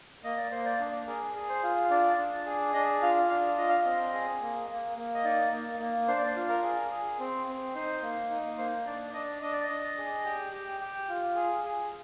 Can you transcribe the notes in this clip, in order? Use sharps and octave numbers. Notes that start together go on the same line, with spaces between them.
A#3 D#5
D5
A#3 C5
D5
D4
G#4 A#4
G#4
C5
F4
D4 D5
D4
G#4
D4 D#5
F4 F5
D4 F5
F4 D#5
F5
C4 D#5
G#4
A#3
A#3
A#3
D#5
D#4 D5
A#3
A#3
D4 C5
D5
C5
F4
A#4
G#4
G#4
C4
C4
D#4 C5
A#3
D#4
A#3 C5
D4 D5
D4 D#5
D4 D#5
D5
D#5
D4
G#4
G4
G4
G4
F4
G#4
G#4